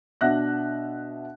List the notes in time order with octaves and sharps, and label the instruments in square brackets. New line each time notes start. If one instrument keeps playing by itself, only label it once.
[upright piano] B2 D4 E5 F#5 F#6 A#6